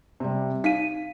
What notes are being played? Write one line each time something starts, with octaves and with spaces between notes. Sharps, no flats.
C3 G3
D#4 F5 B6 D#7